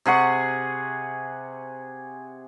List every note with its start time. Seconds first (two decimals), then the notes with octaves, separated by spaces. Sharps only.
0.06 C3 G#4 F#5 C#6